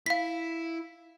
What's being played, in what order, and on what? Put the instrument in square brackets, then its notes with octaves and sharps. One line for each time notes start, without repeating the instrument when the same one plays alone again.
[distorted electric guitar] E4 [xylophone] F5 B6